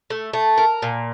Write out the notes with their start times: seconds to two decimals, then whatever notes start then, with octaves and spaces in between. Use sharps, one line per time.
0.10 A3
0.33 A3
0.58 A#4
0.82 A#2